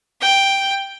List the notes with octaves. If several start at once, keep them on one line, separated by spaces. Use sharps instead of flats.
G5